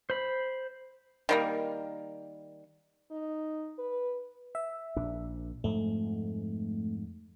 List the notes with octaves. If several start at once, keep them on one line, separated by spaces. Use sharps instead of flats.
C5 B5
D#3 G3 A#3
D#4
B4
E5
A#1 D4
F2 G#2 A3